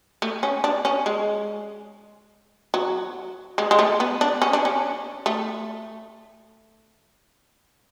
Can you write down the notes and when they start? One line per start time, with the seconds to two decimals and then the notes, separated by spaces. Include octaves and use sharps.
0.22 A3
0.43 C#4
0.64 D4
0.85 C#4
1.06 G#3
2.74 F#3
3.58 G#3
3.71 G#3
3.79 A3
4.00 B3
4.21 D4
4.42 C#4
4.53 D4
4.65 C#4
5.26 A3